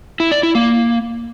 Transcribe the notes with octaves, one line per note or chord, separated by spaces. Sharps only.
E4
D5
E4
A#3